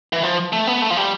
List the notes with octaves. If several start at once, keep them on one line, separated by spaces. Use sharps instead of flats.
E3
F3
A3
B3
A3
F3
G3